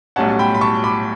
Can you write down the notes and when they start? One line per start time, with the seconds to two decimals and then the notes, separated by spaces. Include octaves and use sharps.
0.16 B1 A2 G3 C#4 F#5 A5
0.39 G5 B5
0.55 B5
0.61 A5 C#6
0.84 B5 D6